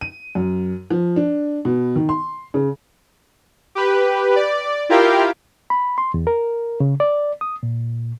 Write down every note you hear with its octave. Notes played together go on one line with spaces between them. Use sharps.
D#7
F#2
F3
D4
B2
D#3
C6
C#3
G4 B4
D5
E4 F4 G4 A#4 F5 G5
B5
C6
E2
A#4
C#3
D5
D#6
A#2